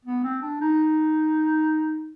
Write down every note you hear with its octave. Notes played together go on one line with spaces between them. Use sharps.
B3
C4
D4
D#4